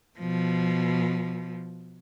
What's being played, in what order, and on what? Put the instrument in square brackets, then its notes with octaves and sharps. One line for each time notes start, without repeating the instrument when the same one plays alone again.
[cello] B2 F3